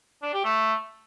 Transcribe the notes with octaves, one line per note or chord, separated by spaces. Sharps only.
D4
G4
A3